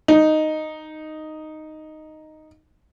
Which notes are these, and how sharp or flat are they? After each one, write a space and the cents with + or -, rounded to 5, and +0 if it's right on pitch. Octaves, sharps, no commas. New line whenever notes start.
D#4 -5